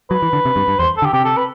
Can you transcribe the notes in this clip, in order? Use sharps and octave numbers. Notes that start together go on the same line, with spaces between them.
F#3 B4
E3
D3
C3
G2
G2
E2 C5
A4
D3 G4
C3 G4
A4
B4